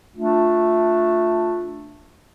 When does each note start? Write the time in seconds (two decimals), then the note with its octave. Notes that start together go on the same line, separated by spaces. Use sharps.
0.15 A3 D4 F4